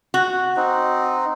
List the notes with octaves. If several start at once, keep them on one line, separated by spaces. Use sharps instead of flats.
F#4
C4 D#4